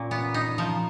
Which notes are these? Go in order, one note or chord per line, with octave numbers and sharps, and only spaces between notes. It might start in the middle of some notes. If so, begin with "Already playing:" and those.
Already playing: A#2 C#4
B3
D#4
F3